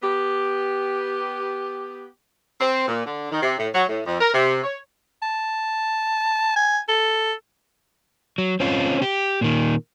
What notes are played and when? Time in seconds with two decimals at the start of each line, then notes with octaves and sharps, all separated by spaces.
0.02 B3 G4
2.61 C4
2.88 A#2
3.06 D3
3.31 D#3
3.42 C3
3.58 A2
3.74 F#3
3.89 A2
4.06 F2
4.21 A#4
4.34 C3
4.64 C#5
5.22 A5
6.56 G#5
6.88 A4
8.38 F#3
8.60 C4 C#4 F4
9.02 G4
9.41 A#2 D#3